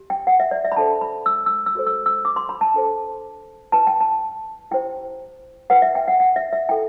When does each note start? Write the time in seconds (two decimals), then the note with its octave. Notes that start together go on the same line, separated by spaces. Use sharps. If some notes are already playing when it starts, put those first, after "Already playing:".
Already playing: G4
0.10 G5
0.27 F#5
0.40 E5
0.51 D5
0.64 E5
0.72 B5
0.76 D4 A4 C5 A5
1.01 B5
1.26 E6
1.46 E6
1.66 E6
1.75 F#4 A4 C5
1.87 E6
2.06 E6
2.25 D6
2.36 C6
2.49 B5
2.61 A5
2.74 D4 A4 C5
3.72 E4 B4 A5
3.87 G5
4.01 A5
4.71 E4 G4 C5 G5
5.70 E4 B4 F#5
5.82 E5
5.95 G5
6.08 F#5
6.20 F#5
6.36 E5
6.53 E5
6.69 E4 A4 G5